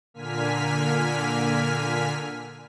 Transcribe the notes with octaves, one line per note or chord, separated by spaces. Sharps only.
A#2 D3 A#3 G#5 F6 B6